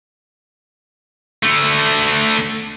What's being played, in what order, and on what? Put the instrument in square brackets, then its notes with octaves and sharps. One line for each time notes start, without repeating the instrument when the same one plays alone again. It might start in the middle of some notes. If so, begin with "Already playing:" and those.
[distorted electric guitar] D3 A3